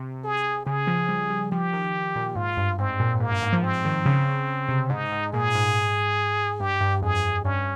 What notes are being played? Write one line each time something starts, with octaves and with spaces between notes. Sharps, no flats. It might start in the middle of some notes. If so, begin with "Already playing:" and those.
Already playing: C3
G#4
C#3 G#4
F3
G3
G3
F3 G4
D#3
A#2
G#2 F4
G2
G#2 C4
A#2
G#2 A#3
G2
G#2
F3
F3 C4
D#3
C#3
C3
G#2 D#4
G#2
A#2 G#4
G#2
G2 G4
G2
F2 G#4
G2 C#4